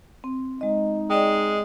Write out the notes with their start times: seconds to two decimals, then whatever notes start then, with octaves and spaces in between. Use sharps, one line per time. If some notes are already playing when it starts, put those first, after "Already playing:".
0.24 C4
0.61 G#3 D#4 D#5
1.10 G#3 D5 D#5 G5